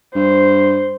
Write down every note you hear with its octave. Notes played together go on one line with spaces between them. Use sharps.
G2 C5